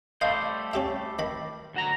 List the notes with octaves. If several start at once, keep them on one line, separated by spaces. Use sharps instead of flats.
G3 A3 C5 D#5 F5
C#4 G4 E5
D#3 B5
D2 F#4 A#5